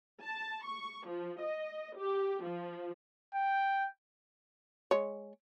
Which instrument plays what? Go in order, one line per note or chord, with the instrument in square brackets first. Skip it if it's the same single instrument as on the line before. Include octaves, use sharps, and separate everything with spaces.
[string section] A5
C#6
F3
D#5
G4
F3
[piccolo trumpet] G5
[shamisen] G#3 C#5